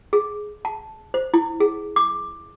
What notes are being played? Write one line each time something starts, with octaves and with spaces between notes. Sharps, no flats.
G#4
A5
C5
E4
G#4
D6